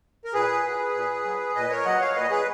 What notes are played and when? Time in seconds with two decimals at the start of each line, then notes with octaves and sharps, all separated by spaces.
0.25 A#4
0.33 A#2 G#4 B4
0.64 F#3
0.95 A#2
1.25 F#3
1.55 A#2 B4 D#5
1.70 A#4 C#5
1.85 F#3 D#5 F#5
2.01 C#5 F5
2.16 A#2 B4 D#5
2.31 G#4 B4